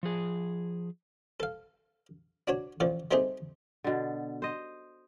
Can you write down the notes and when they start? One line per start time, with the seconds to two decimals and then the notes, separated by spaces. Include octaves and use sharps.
0.03 F3 G#4
1.40 A4 F5
2.48 D4 F#4 C#5
2.80 A1 F3 D5
3.11 G3 A3 C4 D#4 G4 G#4
3.84 B2 D3
4.42 C5 D#5